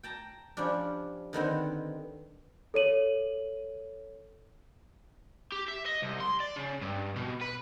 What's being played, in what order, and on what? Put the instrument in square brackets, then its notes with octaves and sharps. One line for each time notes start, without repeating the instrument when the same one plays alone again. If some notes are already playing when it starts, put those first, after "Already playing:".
[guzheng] G5 A5 A#5
F3 G3 C#4 D4
D3 D#3 B3 C4
[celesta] A4 C#5 D#7 F#7
[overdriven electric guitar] G4
E5
D#5
C2
C6
D5
C#3
G2
B2
B4